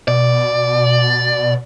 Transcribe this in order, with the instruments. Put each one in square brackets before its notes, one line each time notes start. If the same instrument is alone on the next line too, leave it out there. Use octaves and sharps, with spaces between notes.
[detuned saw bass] B2 [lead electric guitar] D5